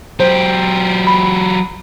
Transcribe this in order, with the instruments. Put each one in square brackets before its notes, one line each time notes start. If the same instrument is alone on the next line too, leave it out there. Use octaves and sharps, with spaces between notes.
[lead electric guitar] F#3 G4 [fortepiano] C5
[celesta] B5